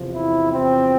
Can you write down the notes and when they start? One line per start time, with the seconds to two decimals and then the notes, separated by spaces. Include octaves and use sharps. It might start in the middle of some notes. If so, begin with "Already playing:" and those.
Already playing: E2 C3 F3
0.12 E4
0.51 C4